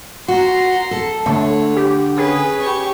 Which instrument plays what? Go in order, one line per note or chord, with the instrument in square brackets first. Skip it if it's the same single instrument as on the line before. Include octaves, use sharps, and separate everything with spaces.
[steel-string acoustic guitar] F#4 [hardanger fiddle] A#5 C6
[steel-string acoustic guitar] A4
[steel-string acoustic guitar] D3 [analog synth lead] A3 [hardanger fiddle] C#5
[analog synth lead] G4
[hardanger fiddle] C#4 B4 [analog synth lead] G#4
[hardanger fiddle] G4 C#6